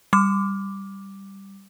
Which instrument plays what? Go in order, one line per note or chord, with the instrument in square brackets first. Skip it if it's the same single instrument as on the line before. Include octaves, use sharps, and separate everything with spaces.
[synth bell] G3 D6